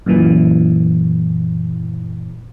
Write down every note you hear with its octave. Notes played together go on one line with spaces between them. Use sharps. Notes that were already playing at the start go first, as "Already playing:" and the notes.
F#2 A#2 E3